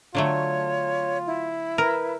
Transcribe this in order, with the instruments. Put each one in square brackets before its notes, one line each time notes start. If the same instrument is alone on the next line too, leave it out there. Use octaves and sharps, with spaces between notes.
[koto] D3 F#3 A3 [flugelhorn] F4 [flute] C#5
[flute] E4
[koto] A#4 [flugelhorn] B4